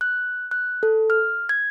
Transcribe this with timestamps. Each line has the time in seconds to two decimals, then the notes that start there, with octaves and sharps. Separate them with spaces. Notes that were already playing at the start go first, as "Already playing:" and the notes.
0.01 F#6
0.51 F#6
0.83 A4
1.10 F6
1.49 G#6